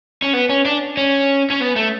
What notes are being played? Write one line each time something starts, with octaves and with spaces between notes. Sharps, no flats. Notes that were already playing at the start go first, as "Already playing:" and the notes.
C#4
B3
C#4
D4
C#4
C#4
B3
A3